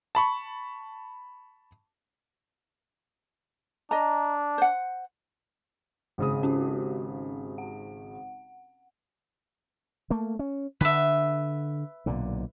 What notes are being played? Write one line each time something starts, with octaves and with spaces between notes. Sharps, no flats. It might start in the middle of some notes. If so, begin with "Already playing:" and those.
A5 B5 C#6
D4 D#5 A#5
C5 F#5
G#1 C#3 D#6
C#4 F#4 G4
F#5
A3 A#3
C#4
D3 B4 E5
B1 A#2 D3